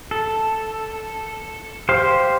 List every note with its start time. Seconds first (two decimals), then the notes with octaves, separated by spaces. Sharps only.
0.11 A4
1.89 G4 C5 F5